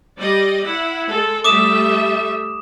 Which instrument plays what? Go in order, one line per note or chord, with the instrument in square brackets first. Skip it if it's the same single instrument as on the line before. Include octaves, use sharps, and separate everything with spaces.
[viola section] G3 D5 D#5
E4 F#5
G#3 A4
[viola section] G3 A3 E5 [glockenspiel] D6 D#6 E7